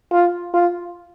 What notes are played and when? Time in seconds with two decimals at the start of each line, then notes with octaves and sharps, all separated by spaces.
0.12 F4
0.54 F4